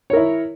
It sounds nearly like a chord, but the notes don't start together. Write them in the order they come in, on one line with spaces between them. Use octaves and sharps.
C#5 A#4 E4